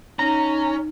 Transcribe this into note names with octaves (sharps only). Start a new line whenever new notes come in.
C#4 D#4 A#5